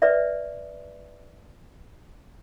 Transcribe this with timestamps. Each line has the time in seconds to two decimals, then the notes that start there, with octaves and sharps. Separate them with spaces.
0.02 B4 D5 E5